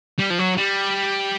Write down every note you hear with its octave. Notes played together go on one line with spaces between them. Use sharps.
G3
F3
F#3
G3